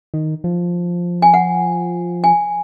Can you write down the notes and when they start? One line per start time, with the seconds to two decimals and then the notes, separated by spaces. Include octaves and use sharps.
0.14 D#3
0.44 F3
1.22 G#5
1.34 F#5
2.24 G#5